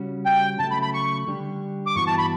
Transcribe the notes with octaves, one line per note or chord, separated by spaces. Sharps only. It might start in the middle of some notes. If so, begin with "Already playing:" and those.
Already playing: C#3 G3 C#4 F#4
G5
C#3 F#3 A3 A5
B5
B5
C#6
D3 G3 D4 G4
D6
G2 E3 B3 F#4 C#6
A5
B5